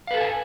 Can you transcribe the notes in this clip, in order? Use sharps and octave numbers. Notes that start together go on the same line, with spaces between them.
A4 B4 F5 G#5 A5